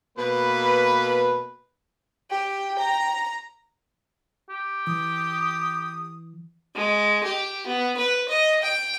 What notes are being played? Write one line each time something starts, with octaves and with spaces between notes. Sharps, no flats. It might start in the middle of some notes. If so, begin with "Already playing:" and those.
B2 A#3 B4
G4 G5
A#5
G4
E3 D#6
G#3
G4
B3
B4
D#5
G5